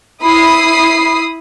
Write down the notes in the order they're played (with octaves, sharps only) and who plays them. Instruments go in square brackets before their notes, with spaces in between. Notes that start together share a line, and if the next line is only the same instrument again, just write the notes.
[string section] E4 B5 D#6 C7